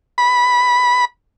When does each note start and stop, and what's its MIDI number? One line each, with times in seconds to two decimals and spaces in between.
0.18 1.05 83